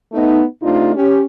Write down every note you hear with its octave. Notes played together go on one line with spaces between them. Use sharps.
A3 B3 D#4
C3 A3 D4 D#4 F4
C#4 G4